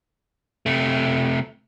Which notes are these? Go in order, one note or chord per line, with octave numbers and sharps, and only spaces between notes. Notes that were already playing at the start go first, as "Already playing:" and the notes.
C3 A3